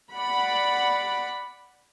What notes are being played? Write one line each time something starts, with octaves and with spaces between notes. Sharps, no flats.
D5 F#5 B5